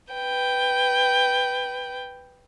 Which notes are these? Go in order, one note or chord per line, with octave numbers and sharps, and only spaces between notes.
B4 G5